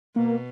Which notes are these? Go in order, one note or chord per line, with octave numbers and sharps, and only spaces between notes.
B2 A#3